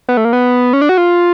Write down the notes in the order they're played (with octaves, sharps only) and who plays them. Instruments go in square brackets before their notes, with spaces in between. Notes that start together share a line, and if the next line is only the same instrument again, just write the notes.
[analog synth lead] B3
A3
A#3
B3
C#4
D4
F#4
F4